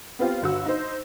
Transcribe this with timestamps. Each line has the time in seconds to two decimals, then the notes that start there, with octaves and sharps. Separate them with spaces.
0.19 B3 C4 F4 G4
0.42 G1 F#4 E6
0.66 D#4 C5